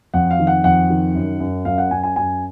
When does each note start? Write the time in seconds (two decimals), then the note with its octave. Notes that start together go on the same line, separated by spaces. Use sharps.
0.14 F2 F#5
0.31 F5
0.39 D#3
0.47 F#5
0.64 F2 F#5
0.90 D#3
1.15 F#2
1.40 F#2
1.65 F#2 F5
1.78 F#5
1.91 F#2 G#5
2.03 G#5
2.16 F#2 G#5